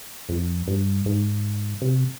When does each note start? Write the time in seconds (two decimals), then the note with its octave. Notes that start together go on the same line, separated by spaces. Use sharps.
0.29 F2
0.68 G2
1.06 G#2
1.82 C3